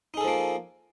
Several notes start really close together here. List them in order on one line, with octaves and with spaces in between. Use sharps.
D#4 G#4 A4 F3 A#3